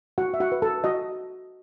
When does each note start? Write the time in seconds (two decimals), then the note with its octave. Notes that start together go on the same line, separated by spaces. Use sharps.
0.18 F#4 F#5
0.34 E5
0.40 F#4 F#5
0.52 B4
0.62 A4 A5
0.84 F#4 D#5